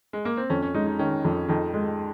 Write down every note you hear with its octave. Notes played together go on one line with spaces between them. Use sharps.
G#3
A#3
C4
F2 C#4
C#4
G#3 D#4
D#4
D#3 C#4
F2
F2 D#4
G#3